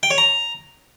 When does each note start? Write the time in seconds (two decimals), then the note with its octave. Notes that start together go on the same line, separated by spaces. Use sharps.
0.03 G5
0.11 C#5
0.18 A#5